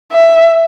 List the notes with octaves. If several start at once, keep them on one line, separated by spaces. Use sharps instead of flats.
E5